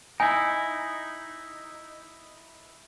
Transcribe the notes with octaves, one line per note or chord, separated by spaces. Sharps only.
D#4 E4 G#5